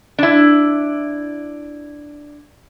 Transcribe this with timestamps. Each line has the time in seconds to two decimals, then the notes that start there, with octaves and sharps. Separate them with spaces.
0.19 D4 E4